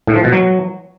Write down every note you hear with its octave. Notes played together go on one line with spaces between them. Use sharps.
A2
F3
B2
F#3